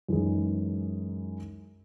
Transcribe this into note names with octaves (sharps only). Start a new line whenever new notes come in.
F#2 E3 G#3 D#4 G#4